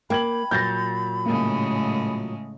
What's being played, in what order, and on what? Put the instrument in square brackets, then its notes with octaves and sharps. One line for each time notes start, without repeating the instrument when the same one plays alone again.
[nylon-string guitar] A#3 [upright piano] G5 G#6 F#7 [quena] B5
[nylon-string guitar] A#2 F#3 [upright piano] G6 A6 A#6
[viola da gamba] A2 C#3 G#3 [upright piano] A#3